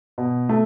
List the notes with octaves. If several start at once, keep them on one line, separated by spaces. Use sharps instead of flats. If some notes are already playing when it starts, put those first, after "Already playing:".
B2
A3